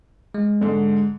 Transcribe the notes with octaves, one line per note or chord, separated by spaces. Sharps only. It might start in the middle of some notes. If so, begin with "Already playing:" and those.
G#3
G#2 D3